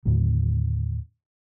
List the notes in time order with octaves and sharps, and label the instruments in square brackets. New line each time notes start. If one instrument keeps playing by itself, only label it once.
[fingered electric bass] D#2 A2 D3 F#3